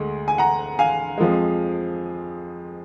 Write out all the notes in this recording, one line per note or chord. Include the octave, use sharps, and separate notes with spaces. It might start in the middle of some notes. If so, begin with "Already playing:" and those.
Already playing: D2 D3 G#3
G#5
F#5 A#5
F5 G#5
F2 F3 G#3